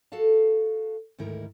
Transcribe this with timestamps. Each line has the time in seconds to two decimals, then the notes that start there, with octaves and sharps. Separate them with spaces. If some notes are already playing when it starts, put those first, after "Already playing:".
0.12 F#4 A4 F5 A5
1.18 D2 G#2 D#3 E4 A#4